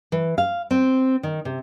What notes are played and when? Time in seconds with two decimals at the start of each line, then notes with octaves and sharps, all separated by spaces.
0.12 E3
0.38 F5
0.71 C4
1.23 D#3
1.45 C3